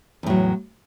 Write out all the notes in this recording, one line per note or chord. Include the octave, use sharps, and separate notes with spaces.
E2 A2 F#3